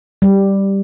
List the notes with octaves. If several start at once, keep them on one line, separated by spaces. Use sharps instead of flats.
G3